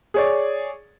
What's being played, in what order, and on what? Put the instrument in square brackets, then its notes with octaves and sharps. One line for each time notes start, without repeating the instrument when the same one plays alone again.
[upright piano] G#4 C#5 D5